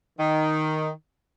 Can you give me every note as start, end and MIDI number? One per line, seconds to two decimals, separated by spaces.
0.19 0.89 51